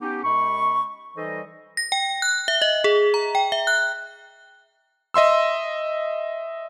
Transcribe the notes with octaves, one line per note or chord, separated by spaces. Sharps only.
B3 C#4 D#4 G4
F#2 G#3 B5 C#6
E3 G3 D#4 A4 C5 D#5
A#6
G5
F#6
E5
D#5
G#4
A#5
G5
E5
F#6
D#5 E5 C6 E6